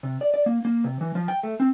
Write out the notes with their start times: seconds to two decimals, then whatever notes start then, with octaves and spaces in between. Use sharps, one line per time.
0.03 C3
0.21 D5
0.34 D5
0.46 A#3
0.65 A#3
0.84 C3
1.01 E3
1.15 F3
1.28 G5
1.43 A3
1.60 C4